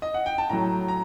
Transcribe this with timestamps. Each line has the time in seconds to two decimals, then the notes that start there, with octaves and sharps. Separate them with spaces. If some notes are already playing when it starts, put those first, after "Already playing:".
0.02 D#5
0.14 F#5
0.26 G5
0.38 A5
0.49 A2 F#3 A#5
0.88 A#5